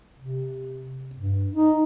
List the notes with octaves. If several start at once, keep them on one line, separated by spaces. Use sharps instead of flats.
C3
G2
D#4